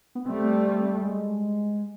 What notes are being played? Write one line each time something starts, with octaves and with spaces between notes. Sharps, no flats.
B3
G3 A3 C4
G#3